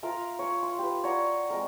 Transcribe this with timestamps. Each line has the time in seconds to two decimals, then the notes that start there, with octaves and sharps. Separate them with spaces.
0.03 F4 A#4 E5 F5
0.39 C#5 C6
0.63 C6
0.79 G4 B4
1.04 C#5 D5 F#5 A#5
1.50 G#3 C4 A#4